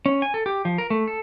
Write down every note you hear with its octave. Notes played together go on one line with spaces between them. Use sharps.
C#4
G#5
A4
G4
F3
A#4
A3
A4